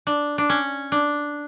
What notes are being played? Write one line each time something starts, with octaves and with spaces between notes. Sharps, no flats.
D4
D4
C#4
D4